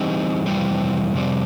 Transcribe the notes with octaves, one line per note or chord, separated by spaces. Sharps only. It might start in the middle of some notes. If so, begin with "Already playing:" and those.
Already playing: E3 G3 C4 D#4 G#4
F2 C3 E3 G3 C4
F2 C3 G3 C4